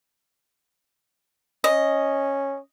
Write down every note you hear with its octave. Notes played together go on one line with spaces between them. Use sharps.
C#4 D#5